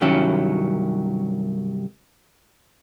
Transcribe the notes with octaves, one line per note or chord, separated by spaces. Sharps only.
C2 G2 D#3 F#3 C#4 E4